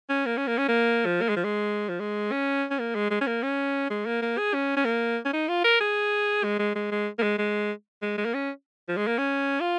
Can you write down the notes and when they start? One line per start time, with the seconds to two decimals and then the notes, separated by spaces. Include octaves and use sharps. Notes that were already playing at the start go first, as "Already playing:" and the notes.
0.09 C#4
0.26 A#3
0.37 C#4
0.47 A#3
0.58 C#4
0.68 A#3
1.06 F3
1.21 A#3
1.29 G#3
1.36 F3
1.44 G#3
1.89 F3
2.00 G#3
2.32 C#4
2.70 C#4
2.79 A#3
2.95 G#3
3.11 G#3
3.21 C#4
3.27 A#3
3.43 C#4
3.91 G#3
4.06 A#3
4.22 A#3
4.38 G#4
4.54 C#4
4.77 C#4
4.85 A#3
5.25 C#4
5.33 D#4
5.48 F4
5.64 A#4
5.80 G#4
6.44 G#3
6.59 G#3
6.75 G#3
6.92 G#3
7.19 A#3
7.23 G#3
7.39 G#3
8.02 G#3
8.18 G#3
8.25 A#3
8.34 C#4
8.88 F3
8.97 G#3
9.07 A#3
9.18 C#4
9.61 F4